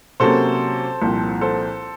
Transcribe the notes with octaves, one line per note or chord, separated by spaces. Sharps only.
C3 F#3 A#3 C#4 A4 C5
C2 A#2 F3 C4
A4 C5